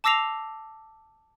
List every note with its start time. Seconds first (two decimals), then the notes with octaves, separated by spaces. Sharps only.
0.04 A5 D6 E6 A#6 C7 F7